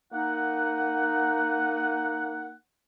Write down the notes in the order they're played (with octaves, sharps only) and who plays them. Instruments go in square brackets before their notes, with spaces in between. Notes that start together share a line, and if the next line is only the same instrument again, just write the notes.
[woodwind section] A#3 D#4 F#5